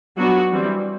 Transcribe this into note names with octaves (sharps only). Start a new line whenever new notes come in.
F#3 B3 D4 F#4
E3 G3 C4